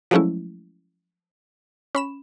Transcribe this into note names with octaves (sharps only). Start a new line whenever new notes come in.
F3 F#3 G#3 A3 C#4 E4
C#4 B5 E7